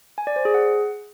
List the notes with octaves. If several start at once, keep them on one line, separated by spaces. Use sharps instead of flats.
G#5
D5
C5
G#4
F#5